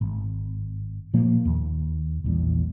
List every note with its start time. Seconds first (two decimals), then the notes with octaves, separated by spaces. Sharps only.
0.01 G#1
1.14 A#2 F3 A#3
1.45 D#2
2.24 A#1 E2 G3